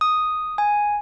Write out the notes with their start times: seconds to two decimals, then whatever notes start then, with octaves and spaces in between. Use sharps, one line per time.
0.01 D#6
0.58 G#5